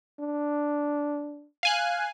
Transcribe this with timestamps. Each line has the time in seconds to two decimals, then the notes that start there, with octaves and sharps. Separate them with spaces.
0.20 D4
1.63 F5 G#5 F#6